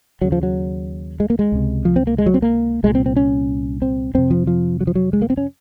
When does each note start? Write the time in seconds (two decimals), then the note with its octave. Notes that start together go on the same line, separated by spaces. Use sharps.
0.21 D#2 C#3 F#3
0.32 F3
0.43 F#3
1.20 G#3
1.30 A#3
1.39 G#3
1.52 C#2 C3
1.85 F3
1.96 C4
2.07 A#3
2.18 G#3
2.26 F#3
2.34 C4
2.42 A#3
2.83 C2 A#2 G#3
2.95 C4
3.06 C4
3.16 C#4
3.82 C4
4.14 F2 C3 C4
4.31 F3
4.47 F3
4.81 F#3
4.87 F3
4.95 F#3
5.13 G#3
5.22 A#3
5.30 C4
5.37 C#4